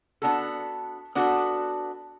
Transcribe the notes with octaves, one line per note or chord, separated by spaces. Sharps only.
B3 D4 F#4 A4
B3 D4 F#4 A4